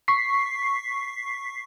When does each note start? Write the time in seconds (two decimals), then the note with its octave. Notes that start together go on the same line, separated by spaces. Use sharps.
0.08 C#6 B6 C7